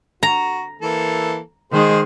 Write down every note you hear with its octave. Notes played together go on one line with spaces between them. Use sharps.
F#4 A#5
E3 A#3 A4
D#3 G#3 G#4 C5